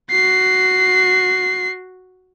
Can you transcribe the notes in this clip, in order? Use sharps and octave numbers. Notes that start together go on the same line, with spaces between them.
F#4 C7